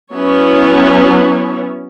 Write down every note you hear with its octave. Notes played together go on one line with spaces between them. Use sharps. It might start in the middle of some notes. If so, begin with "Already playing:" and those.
F#3 B3 C#4 E4 C#5